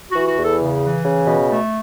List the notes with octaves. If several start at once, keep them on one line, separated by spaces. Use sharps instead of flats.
E3 F#4
F#4
E2
A4
C#3
E3
C#3
B2
A3